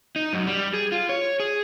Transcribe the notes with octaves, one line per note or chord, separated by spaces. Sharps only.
D#4
F#2
G3
G#4
F4
C#5
G#4